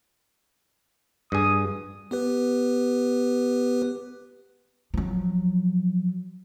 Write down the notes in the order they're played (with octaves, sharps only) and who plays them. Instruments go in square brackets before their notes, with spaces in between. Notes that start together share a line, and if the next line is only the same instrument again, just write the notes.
[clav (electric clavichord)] G2 G#4 [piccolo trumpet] D#6
[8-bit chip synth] B3 G4 B4
[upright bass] F3 F#3